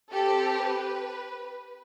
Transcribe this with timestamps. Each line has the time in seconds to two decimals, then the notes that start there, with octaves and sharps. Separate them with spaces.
0.12 C4 G4 A4
0.61 B4